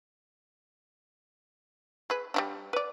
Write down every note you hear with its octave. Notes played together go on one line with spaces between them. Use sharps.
G#4 B4
G3 C#4 D4
B4 D5